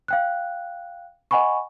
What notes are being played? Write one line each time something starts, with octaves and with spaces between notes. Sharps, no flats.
F5 G5 F#6
D#5 F#5 G#5 B5 C#6